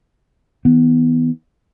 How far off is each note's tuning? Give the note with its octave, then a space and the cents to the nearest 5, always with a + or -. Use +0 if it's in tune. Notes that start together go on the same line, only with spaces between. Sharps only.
D#3 +45 B3 +0